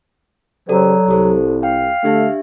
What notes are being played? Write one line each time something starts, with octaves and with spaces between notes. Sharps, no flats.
C#3 F#3 G4 A4 C5 D5
C2 G4 A4 C5
F5 G5
D3 A3 D4 G4 E5